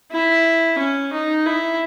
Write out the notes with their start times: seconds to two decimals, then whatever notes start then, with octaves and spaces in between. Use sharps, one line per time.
0.12 E4
0.79 C#4
1.13 D#4
1.46 E4